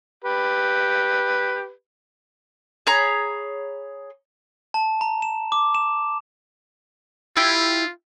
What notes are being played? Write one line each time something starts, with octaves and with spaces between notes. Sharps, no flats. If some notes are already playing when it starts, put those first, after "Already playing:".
G4 B4
G#4 C#5 A#5 B5
A5
A#5
E7
D6
E7
E4 F4 G4